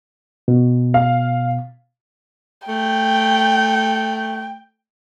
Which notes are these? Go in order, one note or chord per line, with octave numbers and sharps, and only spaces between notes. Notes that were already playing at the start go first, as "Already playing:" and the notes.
B2
F5
A3 G5